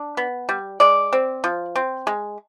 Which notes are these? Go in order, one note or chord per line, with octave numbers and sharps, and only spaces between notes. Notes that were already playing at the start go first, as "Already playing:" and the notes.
Already playing: D4
B3
G3
G#3 D5
C4
F3
C4
G#3